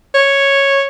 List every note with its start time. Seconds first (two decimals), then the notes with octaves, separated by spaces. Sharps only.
0.14 C#5